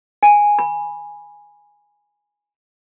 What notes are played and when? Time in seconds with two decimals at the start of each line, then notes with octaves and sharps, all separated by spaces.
0.23 G#5
0.59 B5